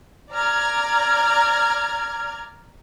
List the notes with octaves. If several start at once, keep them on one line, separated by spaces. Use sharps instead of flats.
D5 A#5 F6 G#6